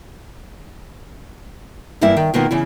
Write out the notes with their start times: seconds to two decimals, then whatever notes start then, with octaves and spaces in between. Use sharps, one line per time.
2.01 E2 G2 A#3 E4 E5
2.17 D#3
2.34 B2 D#3 A#3 B3 F4
2.51 C#3 E3 E4